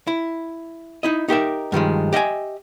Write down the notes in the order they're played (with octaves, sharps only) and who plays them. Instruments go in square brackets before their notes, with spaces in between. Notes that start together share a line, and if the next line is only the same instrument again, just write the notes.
[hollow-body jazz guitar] E4
D#4 E4 D#5
D#4 G4 A#4 E5
G2 D#3 F3 G#3
G4 D#5 E5 F#5 G#5